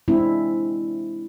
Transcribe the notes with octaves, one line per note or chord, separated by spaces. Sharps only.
G#3 C4 D4 E4